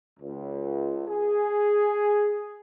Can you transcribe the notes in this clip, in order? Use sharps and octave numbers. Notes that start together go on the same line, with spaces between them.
C#2
G#4